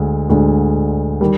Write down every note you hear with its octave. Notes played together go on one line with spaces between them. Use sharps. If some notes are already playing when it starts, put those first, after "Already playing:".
Already playing: D2 D3 G#3
D2 D3 G#3
D#3 G3